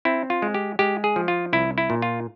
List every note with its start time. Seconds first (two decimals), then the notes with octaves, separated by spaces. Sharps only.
0.05 C4 E4
0.30 F4
0.42 G#3
0.54 G4
0.79 G#3 G4
1.04 G#4
1.16 F3
1.28 F4
1.53 C2 E4
1.78 E4
1.90 A#2
2.02 F4